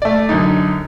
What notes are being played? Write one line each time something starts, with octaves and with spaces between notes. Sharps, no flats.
A3 D5
F#2 D3 D#4